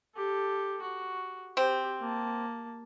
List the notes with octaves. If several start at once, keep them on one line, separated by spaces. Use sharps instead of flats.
G4 A4
F#4
C4 G4
A#3 A5